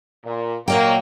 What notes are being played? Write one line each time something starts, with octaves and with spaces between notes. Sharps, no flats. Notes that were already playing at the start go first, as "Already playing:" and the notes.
A#2
A#2 F#3 A#3 D#5 G5